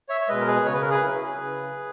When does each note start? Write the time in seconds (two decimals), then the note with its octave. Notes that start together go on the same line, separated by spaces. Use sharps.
0.09 C#5 E5
0.21 C#5
0.28 B2 G#3 B4 D#5
0.41 A#4
0.47 G#4 B4
0.65 C#3 C#5
0.74 B4
0.81 A#4
0.90 G#4 B4
1.03 F#3 C#4 E4
1.42 C#3